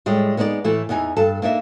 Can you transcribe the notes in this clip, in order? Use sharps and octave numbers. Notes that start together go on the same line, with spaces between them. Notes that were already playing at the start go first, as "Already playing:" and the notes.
A2 G3 G#3
G#3 B3 D#4 C5 D5
A2 E3 A3 E4
E2 E3 D#4 G#5
G2 A4
A#3 D4 D#4 E5